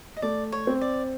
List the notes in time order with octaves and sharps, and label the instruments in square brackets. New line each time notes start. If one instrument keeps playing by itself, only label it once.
[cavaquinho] D#5
[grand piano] A3 [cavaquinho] D5
[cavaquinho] C#5
[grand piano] C4
[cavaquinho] D5